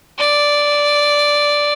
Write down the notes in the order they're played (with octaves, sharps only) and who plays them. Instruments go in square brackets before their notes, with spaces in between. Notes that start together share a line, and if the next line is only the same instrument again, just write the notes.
[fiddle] D5